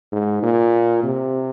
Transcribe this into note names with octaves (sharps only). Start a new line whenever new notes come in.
G#2
A#2
C3